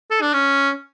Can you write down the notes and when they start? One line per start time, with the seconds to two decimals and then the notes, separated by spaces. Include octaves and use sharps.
0.11 A4
0.21 D4
0.34 C#4